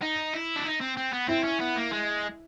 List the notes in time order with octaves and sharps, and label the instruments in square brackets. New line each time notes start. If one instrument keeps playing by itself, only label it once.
[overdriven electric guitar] D#4
E4
D4
D#4
C4
C4
B3
[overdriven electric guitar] C4 [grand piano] E4
[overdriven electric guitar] C#4
B3
A#3
G#3